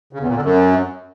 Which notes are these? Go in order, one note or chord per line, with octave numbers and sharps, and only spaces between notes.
C#3
E2
A#2
D3
F#2